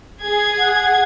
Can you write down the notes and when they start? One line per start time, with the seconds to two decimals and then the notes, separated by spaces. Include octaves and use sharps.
0.22 G#4 G#6
0.59 F#5